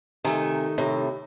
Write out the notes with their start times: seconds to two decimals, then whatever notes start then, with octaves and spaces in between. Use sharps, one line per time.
0.24 C3 D#3 A3 G#5
0.78 A2 C3